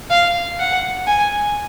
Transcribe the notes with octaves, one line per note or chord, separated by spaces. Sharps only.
F5
F#5
G#5